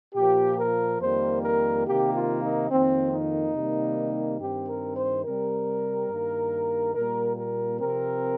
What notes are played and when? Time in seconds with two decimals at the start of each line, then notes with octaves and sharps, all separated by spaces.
0.15 A#2 F3 A#3 G4
0.58 A#4
1.01 F2 D#3 G3 A#3 C5
1.43 A#4
1.86 C3 D#3 A#3 G4
2.14 F4
2.43 D#4
2.71 F2 D#3 A#3 C4
3.13 D#4
3.55 C3 D#3 G3 A#3
4.40 G2 D#3 C4 G4
4.69 A#4
4.97 C5
5.25 C3 G3 C4 A#4
6.10 G2 D#3 A#3
6.95 A#2 G3 A#3 A#4
7.37 A#4
7.80 C3 F3 C4 A#4